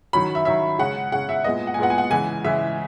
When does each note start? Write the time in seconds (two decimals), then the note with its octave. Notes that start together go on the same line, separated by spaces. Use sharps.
0.13 D#3 F#3 C#4 B5
0.35 E5
0.45 D#3 F#3 C#4 E5
0.79 C#3 G#3 C#4 F#5
1.12 C#3 G#3 C#4 F#5
1.29 E5
1.44 A#2 G#3 B3 D#5
1.67 F#5
1.74 G#5
1.78 A#2 G#3 B3 F#5
1.90 G#5
1.98 F#5
2.10 C#3 E3 G#3 G#5
2.44 C#3 E3 G#3 E5